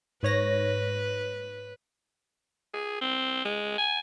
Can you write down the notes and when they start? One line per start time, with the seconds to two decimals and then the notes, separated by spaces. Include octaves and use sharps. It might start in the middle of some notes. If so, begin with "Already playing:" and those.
0.23 G#2 B4 C#5 A#6
2.74 G#4
3.01 C4
3.45 G#3
3.78 G#5